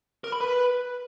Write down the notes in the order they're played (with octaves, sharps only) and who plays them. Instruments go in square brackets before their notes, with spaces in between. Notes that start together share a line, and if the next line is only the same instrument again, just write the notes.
[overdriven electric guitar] A#4
B5
B4